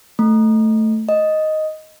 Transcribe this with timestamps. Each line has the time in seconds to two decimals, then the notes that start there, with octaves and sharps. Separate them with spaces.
0.19 A3
1.09 D#5